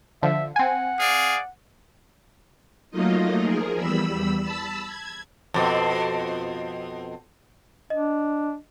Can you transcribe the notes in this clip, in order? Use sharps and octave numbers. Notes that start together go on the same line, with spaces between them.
D3 F3 E5
C4 F#5 G#5
G#4 D5 F5
F#3 A3 A#3 D#4 F4 D#5
F3 G#4 A#4
E2 G3 B5 E6
A5 B5 E6
G#6
F2 B2 C4
D4 D#5